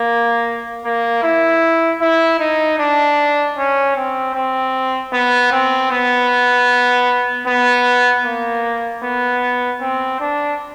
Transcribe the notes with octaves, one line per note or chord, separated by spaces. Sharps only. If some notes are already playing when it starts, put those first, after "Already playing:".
Already playing: A#3
A#3
E4
E4
D#4
D4
C#4
C4
C4
B3
C4
B3
B3
A#3
B3
C4
D4